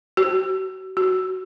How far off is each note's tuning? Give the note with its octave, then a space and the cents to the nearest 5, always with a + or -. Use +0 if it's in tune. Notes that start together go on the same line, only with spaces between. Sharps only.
F#4 +35
F#4 +20